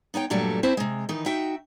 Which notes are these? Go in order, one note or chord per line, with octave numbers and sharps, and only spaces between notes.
B3 D#4 C#5 G5
G2 A#2 F#3 G3 A3 A4
C4 E4 C5 E5 A5
C3 G#3
D#3 E3 D#4
D#4 F#4 E5 G5